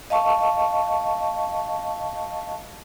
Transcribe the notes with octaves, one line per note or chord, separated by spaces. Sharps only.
D#5 F5 A5 C#6